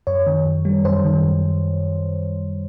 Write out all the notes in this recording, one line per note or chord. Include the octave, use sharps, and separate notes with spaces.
F#2 C#5
D#3
F#2
G3
F#2 C5
D#3
F#2